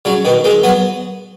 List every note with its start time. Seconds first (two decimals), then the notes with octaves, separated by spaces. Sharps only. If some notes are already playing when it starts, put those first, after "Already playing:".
0.05 C#3 F#3
0.25 B2 D#3
0.44 D#3 G#3
0.63 F#3 B3